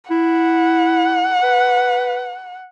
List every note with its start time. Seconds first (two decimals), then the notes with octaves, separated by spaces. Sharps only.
0.11 E4 F#5
1.43 B4